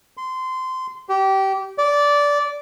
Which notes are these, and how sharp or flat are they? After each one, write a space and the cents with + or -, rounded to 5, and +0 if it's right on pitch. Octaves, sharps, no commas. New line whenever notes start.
C6 -20
G4 -20
D5 -15